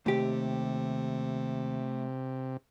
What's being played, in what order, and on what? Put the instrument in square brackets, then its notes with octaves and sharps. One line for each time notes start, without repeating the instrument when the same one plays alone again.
[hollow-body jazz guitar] D#2 G4 [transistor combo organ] C3 [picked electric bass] A3